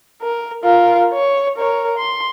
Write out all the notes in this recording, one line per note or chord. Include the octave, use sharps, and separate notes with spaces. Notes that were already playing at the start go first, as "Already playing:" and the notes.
A#4
F4 A#4
C#5
A#4 C#5
C6